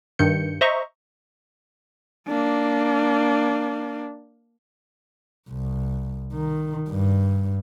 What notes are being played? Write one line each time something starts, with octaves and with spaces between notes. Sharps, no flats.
G2 D#3 G6 C#7
C5 D#5 E5 A#5 C#6
A#3 D4
C2
D#3
G2